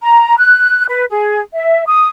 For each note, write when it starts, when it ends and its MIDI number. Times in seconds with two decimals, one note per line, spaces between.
0.03 0.36 82
0.38 0.85 90
0.89 1.04 71
1.10 1.41 68
1.55 1.85 76
1.87 2.08 87